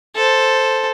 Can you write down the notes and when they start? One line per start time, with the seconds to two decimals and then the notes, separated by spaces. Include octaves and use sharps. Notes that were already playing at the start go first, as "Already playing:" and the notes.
0.16 A4 C5